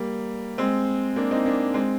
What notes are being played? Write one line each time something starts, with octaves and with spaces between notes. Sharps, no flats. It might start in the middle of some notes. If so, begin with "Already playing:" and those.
Already playing: G3 A#3
G#3 C4
A#3 D4
C4 D#4
A#3 D4
G#3 C4